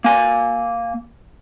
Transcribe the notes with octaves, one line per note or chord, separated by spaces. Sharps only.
A#3 G#5